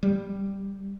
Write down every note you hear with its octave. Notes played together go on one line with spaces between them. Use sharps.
G3